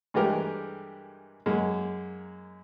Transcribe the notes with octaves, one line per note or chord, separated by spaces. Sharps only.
G2 E3 G#3 A3 G4 A#4
F#2 G#3 A#3